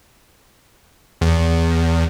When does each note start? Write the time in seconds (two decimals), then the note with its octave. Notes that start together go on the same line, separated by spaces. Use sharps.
1.21 E2